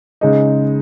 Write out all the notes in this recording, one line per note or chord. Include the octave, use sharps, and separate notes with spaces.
C#3 G#3 D#4